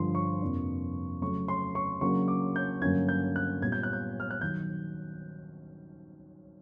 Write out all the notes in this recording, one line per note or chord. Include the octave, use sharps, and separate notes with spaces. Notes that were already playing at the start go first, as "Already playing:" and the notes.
Already playing: G2 D3 F3 C6
C#6
F2 C3 F3 A#3 D4
C#3 F#3 A3 C#6
C6
C#6
C#3 F#3 A#3 D4 C#6
D6
G6
G2 D3 F#3 A#3 C#4 G#6
G6
F#6
A#2 G3 B3 G#6
G6
F#6
G6
F6
F#6
D#3 F#3 G6